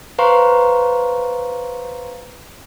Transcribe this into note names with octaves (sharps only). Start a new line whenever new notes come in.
B4 C5 F5 A#5 C6 C#6